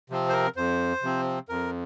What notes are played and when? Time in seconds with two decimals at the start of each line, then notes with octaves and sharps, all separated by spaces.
0.10 C3 F3 C4
0.29 C5
0.33 A#4
0.56 F2 C5
1.02 C3 F3 C4
1.49 F2 A#4